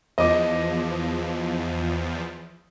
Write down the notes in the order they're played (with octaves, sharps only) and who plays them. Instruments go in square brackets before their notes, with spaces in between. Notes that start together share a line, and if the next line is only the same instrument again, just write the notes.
[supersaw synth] E2 F3 [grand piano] D#5 D6